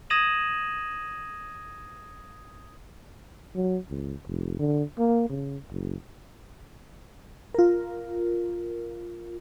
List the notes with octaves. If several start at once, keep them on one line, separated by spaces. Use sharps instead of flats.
D#6 G#6 A#6 D#7 E7 F#7
F#3
C#2
F1
D3
A#3
C#3
F#1
F4 A#4